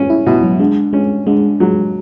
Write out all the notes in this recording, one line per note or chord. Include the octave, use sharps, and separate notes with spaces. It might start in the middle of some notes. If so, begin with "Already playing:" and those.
Already playing: G#3 C#4
E4
B2 E4
F#3
D3 G#3
G#3 C#4
D3 G#3
F#3 G#3